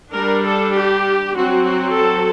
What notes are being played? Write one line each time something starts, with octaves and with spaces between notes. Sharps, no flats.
G3 D4 A#4
A4
G4
F#3 C4 F#4
F#4
A4